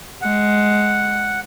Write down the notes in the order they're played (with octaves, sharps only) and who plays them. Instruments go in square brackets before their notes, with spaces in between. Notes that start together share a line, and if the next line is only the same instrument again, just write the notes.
[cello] G#3 [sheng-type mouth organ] F#5